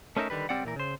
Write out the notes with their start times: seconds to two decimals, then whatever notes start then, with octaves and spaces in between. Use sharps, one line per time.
0.17 A3 C#4 D#4 A#4 E5
0.30 D3 D#3 G3 B4
0.49 C#2 G3 C4 D5 F#5
0.65 A#2 E3 A#4
0.76 C#3 C5